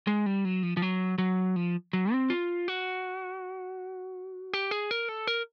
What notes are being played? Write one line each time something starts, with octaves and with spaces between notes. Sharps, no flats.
G#3
G3
F#3
F3
F3
F#3
F#3
F3
F#3
C4
F4
F#4
G4
G#4
A#4
A4
A#4